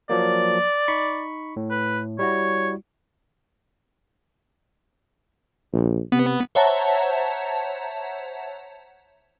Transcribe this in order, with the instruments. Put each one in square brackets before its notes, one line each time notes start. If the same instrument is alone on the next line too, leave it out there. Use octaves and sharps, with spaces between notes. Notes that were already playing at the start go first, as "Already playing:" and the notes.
[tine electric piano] F3 F#3 A#3 [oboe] D5
[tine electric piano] D#4 B5 C#6
A2
[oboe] B4
[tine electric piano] G3 E4 F#4 [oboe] C#5
[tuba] A#1
[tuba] C3 [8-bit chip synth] B3
[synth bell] C5 C#5 E5 F#5 A5 A#5